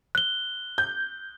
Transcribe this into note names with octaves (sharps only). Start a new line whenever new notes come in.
F#6 G7
G6